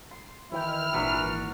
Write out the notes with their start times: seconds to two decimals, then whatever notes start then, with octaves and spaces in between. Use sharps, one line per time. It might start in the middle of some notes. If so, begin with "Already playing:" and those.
0.11 C6
0.52 D#3 E3 E4 G5 F6
0.93 G#1 A#2 E3 F#3 D4 B5